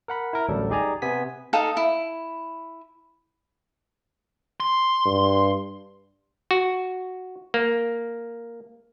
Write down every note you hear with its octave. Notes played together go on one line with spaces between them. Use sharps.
A#4 F#5 B5
E4 A#4
A1 D2 F#3 G3 A4
D#4 G4 G#4 D5 G#5 A#5
C3 B3 G#5 B6
D#4 A4 F5 D#6
E4
C6
G2
F#4
A#3